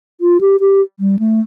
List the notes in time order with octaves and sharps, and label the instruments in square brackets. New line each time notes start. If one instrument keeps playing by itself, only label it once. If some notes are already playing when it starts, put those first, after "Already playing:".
[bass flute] F4
G4
G4
G3
A3